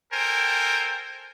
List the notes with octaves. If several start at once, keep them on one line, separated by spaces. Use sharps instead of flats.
A4 A#4 C5 G5 G#5